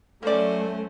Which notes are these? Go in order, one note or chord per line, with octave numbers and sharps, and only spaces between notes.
F#3 A3 A#3 C#4 A4 C5 D5